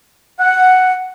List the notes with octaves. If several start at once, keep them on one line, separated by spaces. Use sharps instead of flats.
F#5